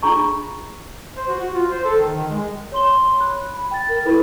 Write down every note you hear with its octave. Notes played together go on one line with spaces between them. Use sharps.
D4 F4 G#4 A#5 C#6
C5
F#4
F#4
F4
C5
A4
D#3
D#3
G#3
C#5 C6 G7
B5 F#6
B5
G5 A6
A#4
E4 A4 B4 B5